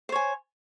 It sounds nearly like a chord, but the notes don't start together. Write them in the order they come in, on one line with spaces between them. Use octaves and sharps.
C5 C#5 G#5